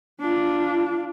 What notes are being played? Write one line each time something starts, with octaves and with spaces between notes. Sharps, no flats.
D4 F4